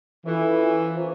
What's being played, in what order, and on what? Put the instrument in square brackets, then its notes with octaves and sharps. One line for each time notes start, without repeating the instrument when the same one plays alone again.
[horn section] E3 [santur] C#4 F4 A4 C#5
[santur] C#4 F4 A4 C#5
F3 A#3 C#4